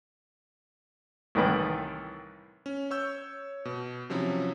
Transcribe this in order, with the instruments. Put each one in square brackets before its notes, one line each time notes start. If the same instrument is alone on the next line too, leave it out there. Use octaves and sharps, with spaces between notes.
[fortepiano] C2 A2 D#3 E3 B4 G5
[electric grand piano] C#4
C#5 C#6 E6 G6
B2
C3 F3 F#3 C#4 E4